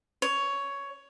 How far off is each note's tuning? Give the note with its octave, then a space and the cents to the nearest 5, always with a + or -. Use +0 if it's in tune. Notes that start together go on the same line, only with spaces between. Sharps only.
C#5 +10